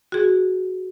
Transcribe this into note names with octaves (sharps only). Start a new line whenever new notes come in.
F#4 G#4